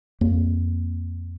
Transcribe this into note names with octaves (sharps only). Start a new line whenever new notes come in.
F2 A#3